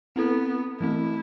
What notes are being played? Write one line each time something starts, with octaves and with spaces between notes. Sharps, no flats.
B3 C4 E4 A4
E3 A3 C4 E4